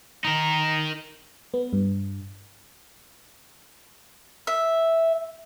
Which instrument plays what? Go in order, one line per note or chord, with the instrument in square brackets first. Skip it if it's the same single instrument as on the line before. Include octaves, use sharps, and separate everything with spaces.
[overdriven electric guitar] D#4 A#4
[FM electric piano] B3
G2
[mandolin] E5